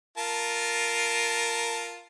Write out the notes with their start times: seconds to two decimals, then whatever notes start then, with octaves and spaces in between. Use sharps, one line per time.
0.18 F4 A#4 A5